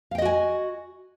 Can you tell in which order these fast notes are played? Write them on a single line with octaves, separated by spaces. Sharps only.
F5 G5 D#5 F#4 G#5